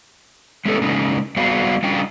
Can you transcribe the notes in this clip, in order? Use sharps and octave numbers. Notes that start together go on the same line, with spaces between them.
G#3 A3 B3 C#4 G4 A4
C#3 G#3 A#3 C#4 D#4
G3 B3 F#4 C5 D5 F5
G3 C#4 D4 F4 D#5 G5